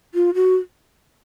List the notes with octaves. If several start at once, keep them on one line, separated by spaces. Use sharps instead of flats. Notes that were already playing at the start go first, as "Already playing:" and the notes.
F4
F#4